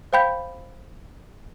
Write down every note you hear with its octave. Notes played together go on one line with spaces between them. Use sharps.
C5 F5 G5 B5 G6 B6